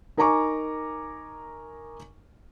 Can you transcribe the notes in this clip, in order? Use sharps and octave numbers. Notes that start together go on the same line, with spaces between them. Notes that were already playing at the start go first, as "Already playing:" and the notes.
D#4 A#4 G#5 A#5 C#6 D6